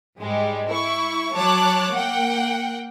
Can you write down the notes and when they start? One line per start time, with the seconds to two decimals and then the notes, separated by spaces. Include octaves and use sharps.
0.20 G#2 G3 G#3
0.70 E4 C#6
1.33 F#3 C#5 A5 D6 F#6
1.93 A#3 F#5 G5